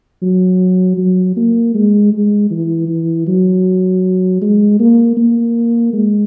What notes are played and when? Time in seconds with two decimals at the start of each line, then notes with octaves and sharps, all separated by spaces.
0.22 F#3
0.98 F#3
1.37 A#3
1.75 G#3
2.13 G#3
2.50 E3
2.88 E3
3.27 F#3
4.41 G#3
4.80 A#3
5.17 A#3
5.93 G#3